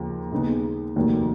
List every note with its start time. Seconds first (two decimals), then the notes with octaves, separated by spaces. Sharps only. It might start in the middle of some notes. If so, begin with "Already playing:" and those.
Already playing: D#2 C#3 F3
0.32 D#2 C#3 G#3 B3 D#4
0.96 F1 D#2 D#3 F#3